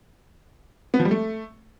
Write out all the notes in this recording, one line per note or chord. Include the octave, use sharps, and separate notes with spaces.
B3
F3
G3
A3